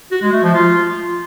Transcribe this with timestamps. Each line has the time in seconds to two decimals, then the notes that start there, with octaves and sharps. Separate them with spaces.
0.11 F#4
0.22 G#3
0.33 A3
0.43 F3
0.54 F4